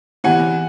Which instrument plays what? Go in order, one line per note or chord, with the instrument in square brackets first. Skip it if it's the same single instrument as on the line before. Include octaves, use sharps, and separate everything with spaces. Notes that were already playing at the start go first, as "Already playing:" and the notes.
[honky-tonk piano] E2 C3 E3 [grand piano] F#5 G#5